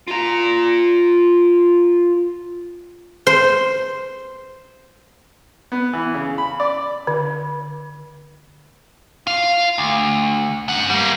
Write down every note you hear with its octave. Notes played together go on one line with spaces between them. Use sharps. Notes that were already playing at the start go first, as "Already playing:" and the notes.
F4 A#5
C5
B3
E3
C#3
B5
D5
D3
F4 F5
D2
F#2 F#5
G3 A#3